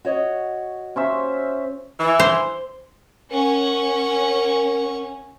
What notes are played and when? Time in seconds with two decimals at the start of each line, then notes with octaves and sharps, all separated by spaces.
0.05 F#4 C#5 D#5
0.96 C#4 C5 E5
1.99 E3
2.20 C5
3.32 C#4 A#4 F#5 C#6